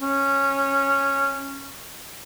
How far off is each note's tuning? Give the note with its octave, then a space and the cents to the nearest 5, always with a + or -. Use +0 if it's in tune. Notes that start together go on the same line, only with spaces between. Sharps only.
C#4 -10